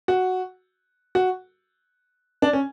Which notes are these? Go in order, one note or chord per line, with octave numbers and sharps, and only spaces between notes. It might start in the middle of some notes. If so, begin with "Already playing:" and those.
F#4
F#4
D4
C#4